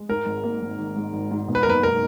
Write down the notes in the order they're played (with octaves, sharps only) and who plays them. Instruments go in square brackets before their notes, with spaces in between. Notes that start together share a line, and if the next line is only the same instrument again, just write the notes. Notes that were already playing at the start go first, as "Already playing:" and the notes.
Already playing: [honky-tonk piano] G#3
[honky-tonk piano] G#2 [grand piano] A#4
[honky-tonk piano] G#1
A#3
G#1
D#3
G#2
G#1
G#2
B2
[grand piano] B4
A#4
[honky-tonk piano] F#1 [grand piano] B4
[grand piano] A#4